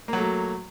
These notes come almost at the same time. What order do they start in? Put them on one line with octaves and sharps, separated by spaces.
A#3 F#3 A3